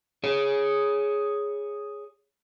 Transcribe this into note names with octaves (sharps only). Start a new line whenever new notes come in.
G#4 C#5